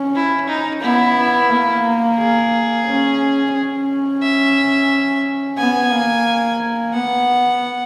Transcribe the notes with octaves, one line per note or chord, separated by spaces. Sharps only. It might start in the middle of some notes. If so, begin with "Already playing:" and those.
Already playing: C#4
E4
D#4
B3 E4
A#3
G#4
C#4
C#4
E5
B3 G#5
A#3
B3 F#5